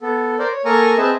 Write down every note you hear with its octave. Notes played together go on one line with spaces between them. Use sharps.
B3 A4
A#4 C5 D5
C#5
A#3 A4 A#4 G#5 A#5 C#6
C4 G#4 B4 D#5 E5 A5